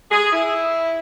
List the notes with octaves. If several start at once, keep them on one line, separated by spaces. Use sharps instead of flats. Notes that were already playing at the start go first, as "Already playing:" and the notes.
G#4
E4